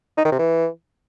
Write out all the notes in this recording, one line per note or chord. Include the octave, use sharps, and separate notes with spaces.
D#4
D#3
C3
E3